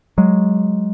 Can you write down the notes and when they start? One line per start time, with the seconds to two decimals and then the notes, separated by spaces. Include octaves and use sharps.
0.18 F#3 G#3